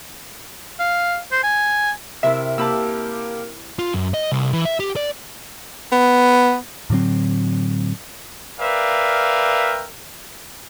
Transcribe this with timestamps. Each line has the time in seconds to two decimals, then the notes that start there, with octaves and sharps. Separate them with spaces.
0.80 F5
1.32 C5
1.44 G#5
2.23 C3 E4 A#4 E5
2.58 A#3 G4 A5 B5 E6
3.79 F4
3.94 F#2
4.14 D#5
4.32 C2
4.53 E3
4.65 E5
4.80 G4
4.96 D5
5.92 B3
6.90 A2 D3 F#3 C4
8.60 A#4 B4 D5 E5 F5 G5